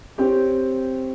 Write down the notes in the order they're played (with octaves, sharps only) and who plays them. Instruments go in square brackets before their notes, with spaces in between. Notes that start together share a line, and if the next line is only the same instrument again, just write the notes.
[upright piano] C4 G4 C#5